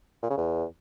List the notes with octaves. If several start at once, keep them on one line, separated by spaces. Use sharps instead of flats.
A#2
C#3
E2